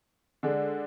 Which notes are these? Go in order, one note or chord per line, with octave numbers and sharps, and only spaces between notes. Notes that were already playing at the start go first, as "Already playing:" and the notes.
D3 G#3 D4